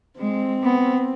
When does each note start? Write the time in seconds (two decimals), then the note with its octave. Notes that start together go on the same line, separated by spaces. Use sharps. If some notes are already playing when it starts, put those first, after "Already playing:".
0.19 G#3 C4
0.63 B3